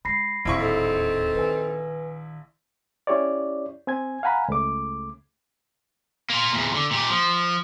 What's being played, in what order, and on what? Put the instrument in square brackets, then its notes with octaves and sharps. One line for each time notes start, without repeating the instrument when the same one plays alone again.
[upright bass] G#3 [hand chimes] B5 A#6 C7
[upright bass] D1 D#2 [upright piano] A#1 E4 C#6 [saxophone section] C4
[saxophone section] C4 D#4 A4
[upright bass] D#3 [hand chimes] B4 G#5
[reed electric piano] C#4 E4 G4 C#5 D5
C4 G#5 G#6
F5 F#5 G#5 A#5 B5
C#2 A3 D6
[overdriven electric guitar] A#3 F4
E2 A#2
D3
A#2 G4
F3